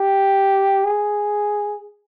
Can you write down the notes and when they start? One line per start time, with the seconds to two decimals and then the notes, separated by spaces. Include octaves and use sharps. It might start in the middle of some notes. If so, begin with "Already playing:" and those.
Already playing: G4
0.85 G#4